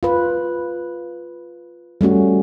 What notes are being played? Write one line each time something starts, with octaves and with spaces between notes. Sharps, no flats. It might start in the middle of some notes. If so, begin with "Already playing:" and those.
F4 B4
G3 A3 C#4 F#4